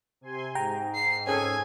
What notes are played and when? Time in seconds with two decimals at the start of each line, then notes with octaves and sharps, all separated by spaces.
0.21 C3 G#5 C6
0.55 G#2 G5 A#5
0.95 C7
1.27 C#4 G#4 A4 G#5